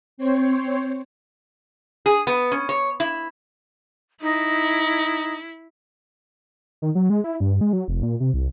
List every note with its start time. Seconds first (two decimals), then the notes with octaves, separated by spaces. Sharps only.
0.18 C4 C5 C#5
2.06 G#4
2.27 B3
2.52 C#4
2.69 C#5
3.00 E4
4.22 D#4 E4
6.82 D#3
6.95 F#3
7.10 G#3
7.24 E4
7.40 G2
7.61 G#3
7.73 F#3
7.88 F1
8.03 A#2
8.20 C3
8.34 C2